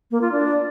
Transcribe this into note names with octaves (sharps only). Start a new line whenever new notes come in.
A#3
F4
D4